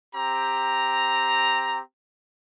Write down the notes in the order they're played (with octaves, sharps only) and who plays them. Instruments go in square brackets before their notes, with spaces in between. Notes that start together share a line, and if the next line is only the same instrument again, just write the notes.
[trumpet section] C4 G4 A#5